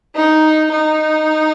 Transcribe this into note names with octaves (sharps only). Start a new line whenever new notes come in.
D#4
D#4